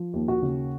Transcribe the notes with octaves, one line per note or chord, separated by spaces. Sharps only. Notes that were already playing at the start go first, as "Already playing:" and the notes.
Already playing: F3
D#2
F#4
C#3